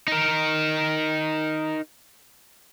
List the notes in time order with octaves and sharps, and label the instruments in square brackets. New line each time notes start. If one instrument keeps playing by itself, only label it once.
[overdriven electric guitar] D#4 A#4